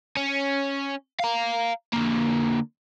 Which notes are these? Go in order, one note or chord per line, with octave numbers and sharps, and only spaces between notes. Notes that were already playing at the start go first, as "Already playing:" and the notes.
C#4
F5 A#5
D3 A#3